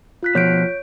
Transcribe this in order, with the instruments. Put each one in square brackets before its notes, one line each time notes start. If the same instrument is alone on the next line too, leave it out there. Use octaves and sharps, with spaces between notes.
[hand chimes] F4 F#6 B6
[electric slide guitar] B2 F3 [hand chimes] C#5 G6 D7